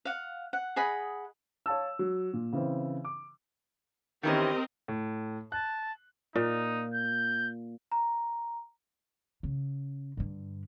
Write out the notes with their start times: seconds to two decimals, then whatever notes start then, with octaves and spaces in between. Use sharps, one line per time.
0.05 F5 F#5
0.53 F#5
0.76 G#4 D#5 F#5 B5
1.66 C#5 F5 A5 E6
1.99 F#3
2.33 A#2
2.53 C#3 E3 C4
3.05 D6
4.23 D#3 E3 C4 C#4 G4 A#4 D#5
4.88 A2
5.52 A5 F#6
6.36 A#2 D#4
6.94 G6
7.92 A#5
9.43 C#3
10.17 G2 D3